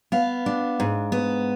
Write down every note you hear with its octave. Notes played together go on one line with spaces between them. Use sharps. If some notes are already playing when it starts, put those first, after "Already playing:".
B3 F5
D4
G#2
B3